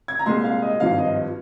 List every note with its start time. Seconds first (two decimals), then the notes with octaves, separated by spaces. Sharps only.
0.08 G#6
0.19 A#5
0.26 C2 A#2 G#3 C6
0.44 F5
0.62 D#5
0.80 G#1 G2 F3 F5
0.98 D#5